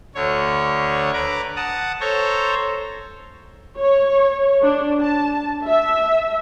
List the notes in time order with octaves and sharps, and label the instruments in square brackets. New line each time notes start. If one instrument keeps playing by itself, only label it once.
[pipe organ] D2 D3 C#5
B4 A#5 D6
F#5 A5 D#6
A4 C5 C#5 A#5
[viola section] C#5
D4
A5
E5